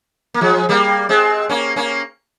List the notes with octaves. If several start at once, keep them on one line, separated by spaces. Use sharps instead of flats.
A#3
F3 G#3
G3 A#3
G#3 C4
A#3 C#4
A#3 C#4